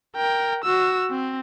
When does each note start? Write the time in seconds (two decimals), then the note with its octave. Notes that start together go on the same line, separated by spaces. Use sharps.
0.16 A#4 G5
0.64 F#4 E6
1.10 C4